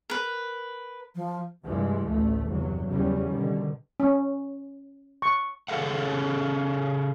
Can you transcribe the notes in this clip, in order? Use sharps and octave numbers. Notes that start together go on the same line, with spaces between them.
A#4 B4
F3
G2 C3 E3 F3 G#3
A1 D2 A3
G1 E2 C3 F#3
E2 C#3 F#3 G3 C#4
B2 D3 D#3
C#4
C#6
C#3 C#4 G#4 A4 F5 F#5